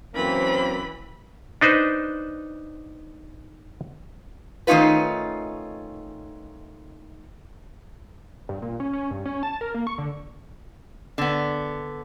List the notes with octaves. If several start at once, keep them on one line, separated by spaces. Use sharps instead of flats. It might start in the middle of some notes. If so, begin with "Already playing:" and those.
F#2 E3 A#3 C4 B5
D4 D#4 B4 C5
D#3 A3 C#4 D#4 F4 B4
G2
A#2
C#4
C#4
G2
C#4
A5
A#4
A#3
C#6
D3
D3 B3